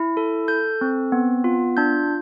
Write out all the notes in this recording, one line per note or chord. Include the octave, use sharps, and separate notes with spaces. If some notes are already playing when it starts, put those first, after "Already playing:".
Already playing: E4
A4
A4 G6
C4
B3
F4
D4 G6